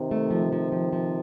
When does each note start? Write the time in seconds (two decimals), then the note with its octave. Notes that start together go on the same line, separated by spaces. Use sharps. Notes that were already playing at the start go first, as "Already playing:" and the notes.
Already playing: C3 D#3
0.11 A3
0.31 F3
0.52 F3
0.72 F3
0.93 F3